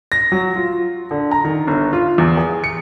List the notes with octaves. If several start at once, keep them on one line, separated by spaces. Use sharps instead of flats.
A#6
F#3
F4
D3
A#5
D#3
G1
F4
E2
G#4
C#7